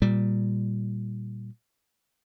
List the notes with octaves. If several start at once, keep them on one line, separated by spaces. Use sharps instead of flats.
A#2 G3